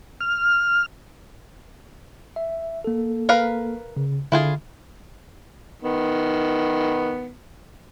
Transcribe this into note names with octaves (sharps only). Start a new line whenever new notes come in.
F6
E5
A#3 A4
A#4 B4 F5
C#3
D3 E4 F4 G#4
D#3 B3